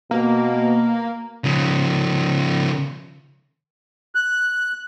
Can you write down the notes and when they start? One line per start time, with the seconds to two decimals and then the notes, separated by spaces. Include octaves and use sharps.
0.11 B2 A#3
1.44 C#3 F3
4.15 F#6